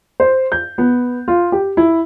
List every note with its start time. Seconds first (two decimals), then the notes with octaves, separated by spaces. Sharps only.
0.20 C5
0.52 G6
0.78 B3
1.28 F4
1.52 G4
1.77 E4